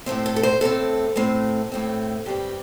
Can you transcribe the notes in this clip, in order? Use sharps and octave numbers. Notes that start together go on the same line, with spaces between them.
A2 A3 C4 C5
A4
A4
C5
A2 A3 C4 A4
A2 A3 C4
A2 A3 C4
G2 G3 C4 G4